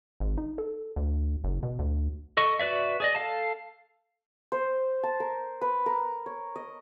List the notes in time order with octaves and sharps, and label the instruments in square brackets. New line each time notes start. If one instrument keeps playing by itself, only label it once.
[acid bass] G#1
D#4
A4
D2
F#1
B2
D2
[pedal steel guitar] A4 D#5 C#6
F#4 B4 D5 E5
G#4 D5 D#5
A4 F5 A5
[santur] C5
A5
A#4
B4
A#4
C#5
D#5